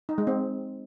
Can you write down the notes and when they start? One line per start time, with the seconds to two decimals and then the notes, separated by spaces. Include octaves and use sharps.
0.09 D#4
0.18 G#3
0.27 C4